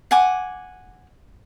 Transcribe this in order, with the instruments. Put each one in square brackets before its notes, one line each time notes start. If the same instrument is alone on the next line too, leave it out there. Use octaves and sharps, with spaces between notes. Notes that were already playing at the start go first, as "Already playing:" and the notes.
[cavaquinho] F#5 G#5 D6